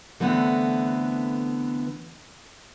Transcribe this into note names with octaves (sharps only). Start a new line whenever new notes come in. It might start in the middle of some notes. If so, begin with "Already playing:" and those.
D3 E3 A3 B3 C4